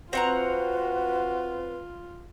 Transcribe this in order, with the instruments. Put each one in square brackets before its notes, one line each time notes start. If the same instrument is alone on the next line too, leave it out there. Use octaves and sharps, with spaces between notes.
[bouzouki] C4 F#5 A#5 [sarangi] F4 [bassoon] F#4 [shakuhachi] B4